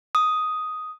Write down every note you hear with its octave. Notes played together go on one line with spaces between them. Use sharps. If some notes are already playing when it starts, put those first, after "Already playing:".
D#6